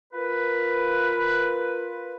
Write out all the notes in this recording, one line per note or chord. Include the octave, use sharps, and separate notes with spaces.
F4 A#4 B4